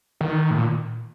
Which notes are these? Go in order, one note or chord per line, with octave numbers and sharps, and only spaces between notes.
D#3
A2
A#2